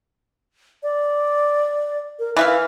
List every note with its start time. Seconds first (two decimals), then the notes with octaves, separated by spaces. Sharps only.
0.83 D5
2.19 A#4
2.37 E3 B4 E5 F5